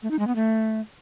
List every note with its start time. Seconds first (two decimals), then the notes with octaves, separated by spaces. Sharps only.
0.03 A3
0.11 D#4
0.19 G#3
0.27 B3
0.36 A3